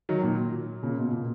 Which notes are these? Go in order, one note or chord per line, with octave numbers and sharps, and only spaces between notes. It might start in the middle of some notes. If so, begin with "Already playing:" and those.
D#3 F#3
A#2
A#2 C#3
B2
A#2